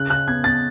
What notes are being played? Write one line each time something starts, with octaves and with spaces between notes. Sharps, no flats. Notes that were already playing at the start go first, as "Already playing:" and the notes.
Already playing: C#3 F#6
C#3 F#6
B3 G#6
B3 A6